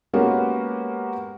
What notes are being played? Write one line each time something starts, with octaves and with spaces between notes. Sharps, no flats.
G#3 A#3 B3 C#4 F#4 G4